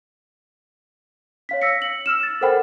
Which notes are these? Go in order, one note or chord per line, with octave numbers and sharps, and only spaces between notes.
C#5 F5 B6
E6 A#6 B6 C#7
F#7
E6 F6 E7
A6
A4 A#4 C5 F#5 G5 B5